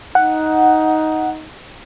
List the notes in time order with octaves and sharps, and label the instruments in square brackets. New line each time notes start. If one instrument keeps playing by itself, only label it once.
[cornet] D#4 [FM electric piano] F#5